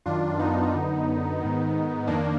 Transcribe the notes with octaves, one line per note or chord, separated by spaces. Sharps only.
F#2 D#3 D4 F4
B3 D#4
F#2 D3
G#2 D#3
F2 D#3 A#3 D4